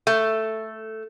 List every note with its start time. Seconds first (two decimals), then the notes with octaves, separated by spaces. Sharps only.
0.07 A3